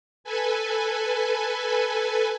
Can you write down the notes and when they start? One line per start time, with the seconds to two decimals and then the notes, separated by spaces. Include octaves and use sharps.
0.24 A4 B4 G#5